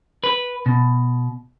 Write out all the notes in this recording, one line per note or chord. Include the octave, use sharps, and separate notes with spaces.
B4
B2